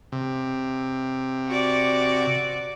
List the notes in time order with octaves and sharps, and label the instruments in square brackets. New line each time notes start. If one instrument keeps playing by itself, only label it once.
[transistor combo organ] C3
[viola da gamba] F#4 D5